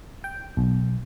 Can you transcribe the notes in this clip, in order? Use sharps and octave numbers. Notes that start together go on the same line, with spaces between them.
G5
B1